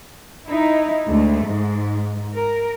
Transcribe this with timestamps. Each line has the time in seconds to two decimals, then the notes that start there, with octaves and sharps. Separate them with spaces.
0.49 D#4 E4
1.07 D2 G#3 A3
1.45 G#2
2.35 A#4